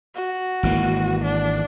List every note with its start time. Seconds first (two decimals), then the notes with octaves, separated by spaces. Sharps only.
0.15 F#4
0.63 G#1 E3 A#3
1.25 D4